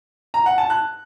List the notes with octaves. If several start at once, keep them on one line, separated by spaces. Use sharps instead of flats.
A#5
F#5
A5
F#6